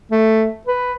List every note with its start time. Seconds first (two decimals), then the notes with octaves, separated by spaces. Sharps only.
0.11 A3
0.67 B4